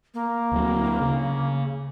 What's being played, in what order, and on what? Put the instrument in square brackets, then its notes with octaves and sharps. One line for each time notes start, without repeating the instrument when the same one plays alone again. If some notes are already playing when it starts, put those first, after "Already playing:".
[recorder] A#3
[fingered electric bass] D2 F#3
C#3